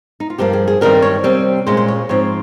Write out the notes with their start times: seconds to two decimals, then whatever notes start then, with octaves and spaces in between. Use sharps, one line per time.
0.20 D#4
0.30 F4
0.38 G2 F3 A#3 G4
0.53 G#4
0.68 G#4
0.81 G2 D#3 G3 C4 A#4
1.02 C#5
1.24 C3 G3 C4
1.67 A#2 G#3 C#4 C5
1.77 C5
1.88 C#5
2.09 G#2 F3 C4 C#5